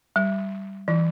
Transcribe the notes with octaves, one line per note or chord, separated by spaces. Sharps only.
G3
E3